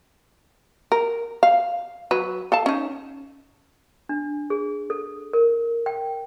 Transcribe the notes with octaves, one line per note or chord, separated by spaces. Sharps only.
A#4
F5
F#3 B4
A4 F5 A5
C#4 D#4
D4
G#4
A4
A#4
G5